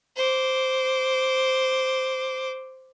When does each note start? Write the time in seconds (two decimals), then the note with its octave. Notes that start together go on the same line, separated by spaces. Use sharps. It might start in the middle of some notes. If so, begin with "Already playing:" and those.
0.16 C5 D6